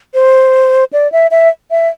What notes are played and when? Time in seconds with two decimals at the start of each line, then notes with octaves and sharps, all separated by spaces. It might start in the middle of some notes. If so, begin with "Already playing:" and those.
0.14 C5
0.93 D5
1.12 E5
1.31 E5
1.71 E5